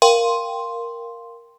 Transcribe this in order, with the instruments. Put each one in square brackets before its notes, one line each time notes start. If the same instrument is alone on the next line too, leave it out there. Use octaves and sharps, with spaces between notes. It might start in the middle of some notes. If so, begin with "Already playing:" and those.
[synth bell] A#4 F5 G5 C6